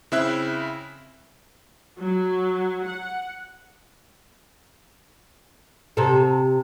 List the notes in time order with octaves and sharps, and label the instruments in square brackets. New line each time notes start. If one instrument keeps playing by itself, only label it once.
[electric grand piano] C#3 C4 E4 E5 F#6
[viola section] F#3
F#5
[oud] C3 A4